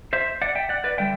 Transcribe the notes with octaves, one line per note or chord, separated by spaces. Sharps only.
C5 E5
D5 F#5
E5 G5
D5 F#5
B4 D5
D3 G3 E5 G5